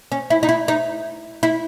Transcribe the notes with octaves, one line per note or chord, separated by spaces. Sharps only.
C#4
E4
D#4
E4
D#4
E4